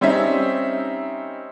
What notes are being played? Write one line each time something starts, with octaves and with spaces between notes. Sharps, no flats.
G3 C4 C#4 D#4 E5